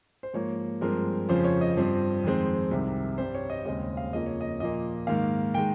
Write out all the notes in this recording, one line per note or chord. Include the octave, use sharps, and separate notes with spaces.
C5
G#2 F3 A#3 C#5
G2 F3 G#3 C4 A#4
F2 C#3 F3 C5
C#5
D#5
G2 F3 C4
F2 D#3 G#3 C4
C2 C3 D#3
G2 G3 C4 C5
C#5
D#5
D#2 C#3 G#3 C4 D#5
F5
F2 C#3 F3 A#3 D#5
C#5
D#5
A#2 F3 A#3 D#5
G#2 D#3 A#3 F5
D#3 G#3 G5